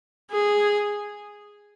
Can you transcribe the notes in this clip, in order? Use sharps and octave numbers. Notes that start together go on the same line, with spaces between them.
G#4